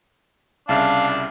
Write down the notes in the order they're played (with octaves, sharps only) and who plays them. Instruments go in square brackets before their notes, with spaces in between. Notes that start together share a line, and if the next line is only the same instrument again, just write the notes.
[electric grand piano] C2 C#3 E5 [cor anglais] D4 [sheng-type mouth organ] F5 A5